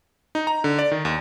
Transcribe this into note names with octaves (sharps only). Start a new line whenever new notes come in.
D#4
A#5
D3
D5
D#3
D#2